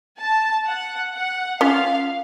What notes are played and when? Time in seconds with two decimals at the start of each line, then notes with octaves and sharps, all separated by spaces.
0.19 A5
0.66 F#5
1.14 F#5
1.61 C#4 F4 F5